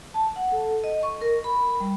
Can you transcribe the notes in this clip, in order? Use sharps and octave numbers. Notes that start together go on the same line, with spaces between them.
A5
F#5
A4
D#5
C#6
A#4
B5
G3